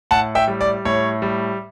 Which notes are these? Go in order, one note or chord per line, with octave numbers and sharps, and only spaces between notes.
A2 F#5 A5
E5 G5
G3
D5
A2 C#5
G3